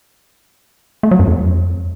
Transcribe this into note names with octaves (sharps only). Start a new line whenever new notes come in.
A3
F#3
F#2
F2